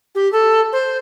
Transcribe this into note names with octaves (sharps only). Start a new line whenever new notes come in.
G4
A4
C5